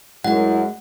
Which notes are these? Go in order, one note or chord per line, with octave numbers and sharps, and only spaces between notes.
F#2 G#3 E4 F#5